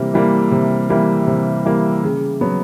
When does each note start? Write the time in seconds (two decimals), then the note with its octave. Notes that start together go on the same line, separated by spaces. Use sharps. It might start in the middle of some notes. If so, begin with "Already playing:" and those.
Already playing: C3 E3 G3 A#3
0.14 E3 G3 A#3
0.51 C3
0.90 E3 G3 A#3
1.27 C3
1.65 E3 G3 A#3
2.03 C#3
2.41 F#3 B3